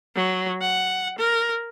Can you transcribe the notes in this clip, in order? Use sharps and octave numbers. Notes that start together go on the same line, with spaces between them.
F#3
F#5
A#4